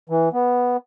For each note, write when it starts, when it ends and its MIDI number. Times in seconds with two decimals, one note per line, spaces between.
0.09 0.29 52
0.33 0.77 59